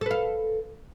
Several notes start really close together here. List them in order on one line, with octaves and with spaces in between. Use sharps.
A4 B4 F5